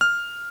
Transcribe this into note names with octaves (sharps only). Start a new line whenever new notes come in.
F6